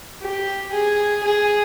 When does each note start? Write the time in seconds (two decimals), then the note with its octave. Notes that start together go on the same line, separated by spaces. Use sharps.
0.22 G4
0.72 G#4
1.23 G#4